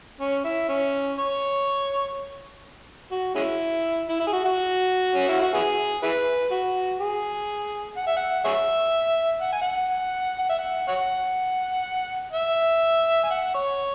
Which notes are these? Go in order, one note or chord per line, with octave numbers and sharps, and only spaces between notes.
C#4
E4
C#4
C#5
F#4
G#3 C#4 E4
E4
E4
G#4
F#4
F#4
C#4
E4
F#4
B3 E4 G#4
E4 G#4 B4
F#4
G#4
F#5
E5
F#5
G#4 C#5 E5
F#5
G#5
F#5
F#5
E5
F#5
C#5 F#5
E5
G#5
F#5
C#5